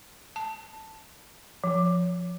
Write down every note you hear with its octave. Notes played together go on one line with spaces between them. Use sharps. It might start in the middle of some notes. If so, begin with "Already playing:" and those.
A5
F3